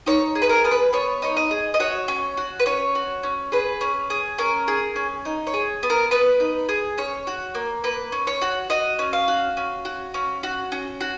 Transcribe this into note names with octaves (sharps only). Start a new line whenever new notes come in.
D#4 C#5
G#4
B4
A#4
B3 A#4
B4
B3 C#5
D#4 C#5
D#5
G#4
D#5
F#4 C#5
C#4
F#4
B4
C#4 C#5
F#4
C#4
G#4 B4
C#4
G#4
C#4 A#4
G#4
C#4
D#4
C#5
G#4
B3
A#4
B3 B4
D#4
G#4
C#4 C#5
F#4
A#3
A#3 B4
C#4
C#5
F#4
F#4 D#5
C#4
F5
F#4
C#4
F#4
C#4
F#4
C#4
F#4